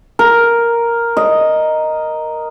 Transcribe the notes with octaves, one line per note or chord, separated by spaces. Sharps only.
A#4
D#5